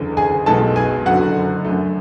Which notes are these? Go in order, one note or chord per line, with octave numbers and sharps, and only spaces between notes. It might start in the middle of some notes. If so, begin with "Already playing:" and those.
Already playing: F#1 E2 D3
G#4 G#5
B1 B2 G#3 B3 A4 A5
G#4 G#5
F#1 F#2 D3 F#4 F#5
F#2 D3 A3